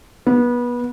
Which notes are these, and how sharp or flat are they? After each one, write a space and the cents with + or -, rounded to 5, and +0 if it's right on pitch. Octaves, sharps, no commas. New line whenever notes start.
B3 -25